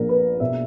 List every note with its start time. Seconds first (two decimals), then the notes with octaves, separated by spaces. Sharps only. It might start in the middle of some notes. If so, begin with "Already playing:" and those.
Already playing: A#1 A#2 A#4
0.09 B4
0.40 B2 E5